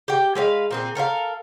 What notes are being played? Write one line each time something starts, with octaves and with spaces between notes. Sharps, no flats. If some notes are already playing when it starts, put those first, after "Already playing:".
G4 G5
G#3 B4 C#5 F5
A#2 C4 G#4
A4 A#4 C5 F5